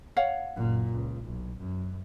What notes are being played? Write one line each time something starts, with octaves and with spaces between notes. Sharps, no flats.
C#5 F5 F#5
F#1 A#2
C#2
B1
F#2